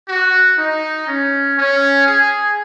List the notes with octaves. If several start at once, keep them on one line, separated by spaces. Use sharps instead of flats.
F#4
D#4
C#4
C#4
G#4